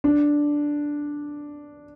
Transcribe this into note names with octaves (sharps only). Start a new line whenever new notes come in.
D4